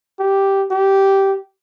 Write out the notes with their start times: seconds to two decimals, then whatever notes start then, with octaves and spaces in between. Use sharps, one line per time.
0.19 G4
0.71 G4